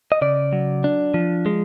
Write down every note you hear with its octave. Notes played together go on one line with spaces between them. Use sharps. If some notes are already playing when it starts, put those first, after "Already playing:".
D#5
C#3 D5
F#3
D4
F3
G#3